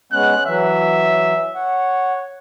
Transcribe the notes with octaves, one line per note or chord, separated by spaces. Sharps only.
G#3 B3 C#4 F#6
E3 F#3 E5
C#5 F#5